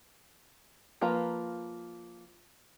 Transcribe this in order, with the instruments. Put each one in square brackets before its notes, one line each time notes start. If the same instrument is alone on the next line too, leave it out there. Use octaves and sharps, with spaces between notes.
[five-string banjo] F3 A#3 F4 B4 A#5